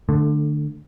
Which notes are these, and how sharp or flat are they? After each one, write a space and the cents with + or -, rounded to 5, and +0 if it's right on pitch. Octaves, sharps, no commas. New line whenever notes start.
D3 +20 A3 +0